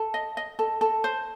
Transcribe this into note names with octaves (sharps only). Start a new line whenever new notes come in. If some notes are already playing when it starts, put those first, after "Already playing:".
Already playing: A4
D#5
D#5
A4
A4
C5